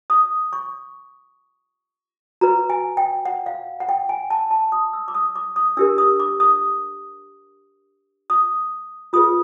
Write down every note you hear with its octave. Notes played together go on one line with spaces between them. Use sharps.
D#6
C#6
F#4 B4 A#5
G#5
G5
F#5
F5
F#5
G5
G#5
A5
A5
D#6
E6
D6
D#6
D6
D#6
D4 G4 A#4 E6
D#6
D6
D#6
D#6
F4 G#4 B4 D#6